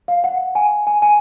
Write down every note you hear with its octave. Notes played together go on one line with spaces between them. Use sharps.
F5
F#5
G#5
G#5
G#5